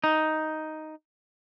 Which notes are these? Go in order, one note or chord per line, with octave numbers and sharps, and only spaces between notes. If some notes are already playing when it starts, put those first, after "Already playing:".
D#4